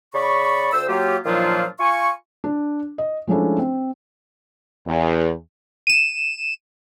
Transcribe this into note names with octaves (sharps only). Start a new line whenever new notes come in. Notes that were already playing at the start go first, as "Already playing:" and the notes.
C#3 D5 B5 C#6
D2 C5 E6
F#3 A#3 F4 G4
A#2 D#3 F3 F#3 D4 F4
F4 G#5 C#6
D4
D#5
F3 G#3 A3 C#4 D4 E4
C4
E2
D#7 E7